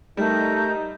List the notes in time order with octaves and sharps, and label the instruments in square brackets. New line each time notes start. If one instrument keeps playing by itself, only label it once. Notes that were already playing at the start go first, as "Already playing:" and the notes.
[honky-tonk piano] G3 [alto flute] A3 [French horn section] D#4 [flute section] A4 A#4 G6